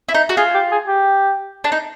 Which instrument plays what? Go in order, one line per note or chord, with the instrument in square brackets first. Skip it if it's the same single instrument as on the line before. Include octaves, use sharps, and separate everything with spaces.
[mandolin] E4
D#4
F#4
[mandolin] F4 [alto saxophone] G#4
[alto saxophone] G4
G#4
G4
[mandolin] D4
D#4